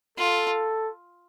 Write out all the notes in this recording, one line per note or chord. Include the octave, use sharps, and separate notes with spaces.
F4 A4